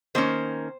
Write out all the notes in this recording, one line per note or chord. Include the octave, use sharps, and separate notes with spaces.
D#3 A#3 C#4 C5